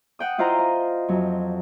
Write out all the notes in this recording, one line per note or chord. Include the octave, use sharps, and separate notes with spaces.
F#5 G5 D#6
E4 F4 C5 D#5 A#5
D#5
F2 F#3